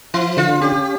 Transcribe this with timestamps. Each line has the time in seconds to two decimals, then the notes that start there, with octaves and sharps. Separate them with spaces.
0.14 F3 E4
0.37 D3 F4
0.60 C#4 G4